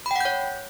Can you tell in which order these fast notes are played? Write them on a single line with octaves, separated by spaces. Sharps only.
B5 G5 F#5 G6 C#5